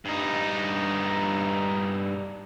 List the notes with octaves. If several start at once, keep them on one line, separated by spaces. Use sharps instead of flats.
G2 D#4